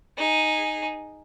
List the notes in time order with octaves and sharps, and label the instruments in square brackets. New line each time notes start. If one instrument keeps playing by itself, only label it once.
[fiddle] D#4 G#4